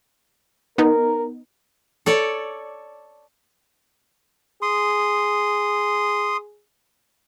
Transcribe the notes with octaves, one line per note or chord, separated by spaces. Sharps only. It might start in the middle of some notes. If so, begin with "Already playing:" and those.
B3 D#4 A#4
A4 C#5 D5
G#4 C6 D#6